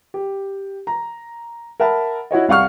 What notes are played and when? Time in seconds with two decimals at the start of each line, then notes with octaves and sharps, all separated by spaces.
0.14 G4
0.87 A#5
1.80 A#4 E5 F#5 A5 B5
2.31 E4 F#4 C#5 D#5
2.49 C2 F5 F#5 C#6 F6